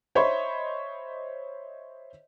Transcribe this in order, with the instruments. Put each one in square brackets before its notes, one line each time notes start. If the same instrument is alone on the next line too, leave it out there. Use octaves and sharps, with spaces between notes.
[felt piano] C5 C#5 D#5 E5 B5 C6